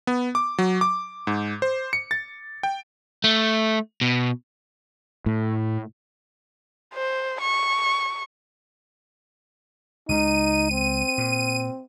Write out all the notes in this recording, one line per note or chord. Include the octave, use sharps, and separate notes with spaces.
B3
D6
F#3
D6
G#2
C5
C#7
A6
G5
A3
B2
A2
C5
C#6
C#2 C#3 D#4 D#7
C4
A#2